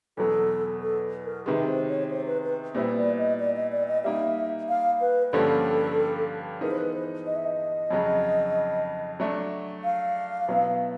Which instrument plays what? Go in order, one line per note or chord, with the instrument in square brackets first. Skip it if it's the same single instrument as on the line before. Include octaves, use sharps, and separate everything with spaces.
[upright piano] E2 B2 F#3 [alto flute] A4
[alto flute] A4
A#4
[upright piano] C3 D#3 G#3 [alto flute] B4
[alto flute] C5
C#5
C5
B4
B4
[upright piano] A#2 G3 B3 E4 [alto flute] C5
[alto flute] D5
D#5
D5
D#5
D5
D#5
[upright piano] G3 A#3 D#4 [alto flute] E5
[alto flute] F5
B4
[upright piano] G2 D3 F3 A#3 C#4 [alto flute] A4
[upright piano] E3 G#3 B3 D#4 [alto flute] A#4
[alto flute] C5
B4
C5
D#5
E5
D#5
[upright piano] F2 C#3 F#3
F#3 A3 D4
[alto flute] F5
[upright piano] B2 F#3 B3 E4